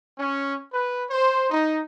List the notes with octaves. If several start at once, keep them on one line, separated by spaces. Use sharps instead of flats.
C#4
B4
C5
D#4